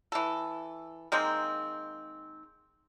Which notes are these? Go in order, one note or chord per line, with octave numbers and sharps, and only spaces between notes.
E3 A4
D#3 G#3 A#3 C4